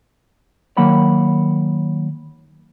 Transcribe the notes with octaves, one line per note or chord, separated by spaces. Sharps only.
D#3 F#3 A#3 F#5 B5